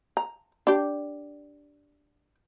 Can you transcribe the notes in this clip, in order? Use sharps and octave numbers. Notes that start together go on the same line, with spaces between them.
A#5
D4 G4